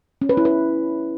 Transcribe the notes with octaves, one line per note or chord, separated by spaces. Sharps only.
C#4
B4
E4
B4